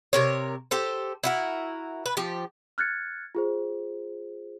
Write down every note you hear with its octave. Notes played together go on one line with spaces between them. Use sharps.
C3 A#4 C#5
G4 A4 C5
E4 F#4 A#4
B4
F3 G4
F6 F#6 G#6 A6 C#7
F4 G#4 C5